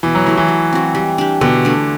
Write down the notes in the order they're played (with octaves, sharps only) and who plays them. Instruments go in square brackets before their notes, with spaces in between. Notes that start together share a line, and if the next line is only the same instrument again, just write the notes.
[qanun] B2 [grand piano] E3
[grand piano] F#3
[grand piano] F#3 [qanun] A3 E4 G4
[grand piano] E3
[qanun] F#3
C4 F#4
G3
D4 G4
[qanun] B2 [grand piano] D3
[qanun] A3 D4